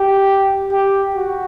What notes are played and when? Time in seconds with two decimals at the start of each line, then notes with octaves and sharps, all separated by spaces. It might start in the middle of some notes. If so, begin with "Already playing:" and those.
Already playing: G4
0.72 G4
1.16 F#4